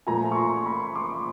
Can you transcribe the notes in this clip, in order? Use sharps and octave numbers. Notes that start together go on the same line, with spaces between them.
A#2 F3 A3 G#5 A#5
C#6
A#5 C6
B5 C#6
C6 D6